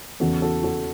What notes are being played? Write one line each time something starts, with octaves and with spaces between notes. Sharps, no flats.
E2 C#3 E3 F#4 A4
F#4 A4
F#4 A4